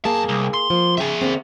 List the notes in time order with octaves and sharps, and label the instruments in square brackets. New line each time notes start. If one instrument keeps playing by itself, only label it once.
[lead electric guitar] F#2 A5 [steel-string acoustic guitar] A#3 G#4
[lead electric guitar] C2
C6
[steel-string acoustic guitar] F3 A#3
[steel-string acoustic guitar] C#3 G5 G#5 [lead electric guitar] G#4 E5
[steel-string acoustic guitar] D3 A#3 C4